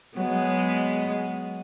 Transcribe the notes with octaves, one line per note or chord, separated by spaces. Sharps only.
F#3 G#3 B3